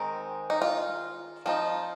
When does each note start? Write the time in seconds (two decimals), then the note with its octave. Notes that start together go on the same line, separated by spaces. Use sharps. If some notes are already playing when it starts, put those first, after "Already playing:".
Already playing: D#3 G#3 C4 D#4
0.50 D#4
0.62 F4
1.46 F3 C4 D#4 F4